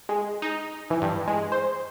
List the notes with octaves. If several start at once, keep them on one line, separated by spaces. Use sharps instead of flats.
G#3
D#4
E3
G2
G#3
C5